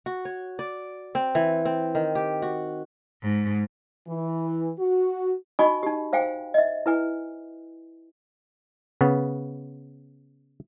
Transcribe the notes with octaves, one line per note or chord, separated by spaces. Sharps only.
F#4
C#5
D5
C4
E3
C4
D#3
G4
F#4
G#2
E3
F#4
D#4 F#4 D#5 G#5 B5 C#6
D#4 G4
C5 F5 G5 G#5
D#5 E5
E4 B4 G#5
C#3 B3